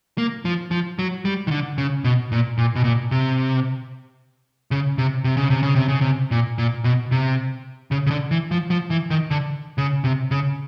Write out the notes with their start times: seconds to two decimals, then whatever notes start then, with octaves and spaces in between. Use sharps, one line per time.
0.18 A#3
0.45 F3
0.71 F3
0.99 F#3
1.25 G3
1.47 D#3
1.51 D3
1.78 C#3
2.04 B2
2.32 A#2
2.58 A#2
2.75 B2
2.84 A#2
3.11 C3
4.71 C#3
4.98 C3
5.24 C3
5.37 C#3
5.50 C3
5.63 C#3
5.75 C3
5.88 C#3
6.01 C3
6.31 A#2
6.58 A#2
6.84 B2
7.11 C3
7.91 C#3
8.06 C#3
8.11 D3
8.31 E3
8.51 F3
8.71 F3
8.90 E3
9.10 D#3
9.31 D3
9.78 C#3
10.04 C3
10.31 C#3